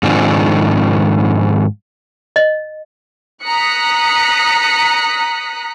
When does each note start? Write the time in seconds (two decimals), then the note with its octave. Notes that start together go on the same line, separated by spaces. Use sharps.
0.03 G#2 D#3 F3 C4 D4
2.36 D#5
3.43 A#5 D#6 F#6 B6 C#7